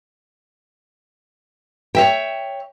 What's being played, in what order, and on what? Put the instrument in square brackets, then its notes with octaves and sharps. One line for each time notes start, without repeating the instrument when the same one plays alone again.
[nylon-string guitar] C#5 E5 G5